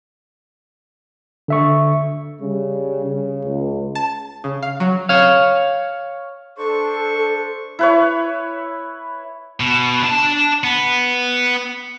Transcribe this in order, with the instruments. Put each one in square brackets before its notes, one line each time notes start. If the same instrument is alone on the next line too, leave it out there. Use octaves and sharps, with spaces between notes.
[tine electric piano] D3 E5 C#6
[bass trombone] C#3 [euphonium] G3
[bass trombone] C#3
[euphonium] C#2
[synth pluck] A5
C#3
F5
F#3
[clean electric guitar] C#5 F5
[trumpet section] D4 C5 C#6 [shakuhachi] A4
[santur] E4 B4 C#5
[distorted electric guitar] B2
D4 A5
B3